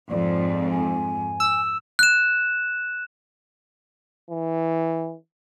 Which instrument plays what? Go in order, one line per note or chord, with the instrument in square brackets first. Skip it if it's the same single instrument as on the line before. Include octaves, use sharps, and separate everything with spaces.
[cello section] F2 G#2 [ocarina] D5
[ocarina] G#5
[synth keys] E6
[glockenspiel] F#6 E7
[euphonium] E3